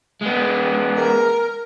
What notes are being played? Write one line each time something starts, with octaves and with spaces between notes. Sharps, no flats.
G#3 B3
A#4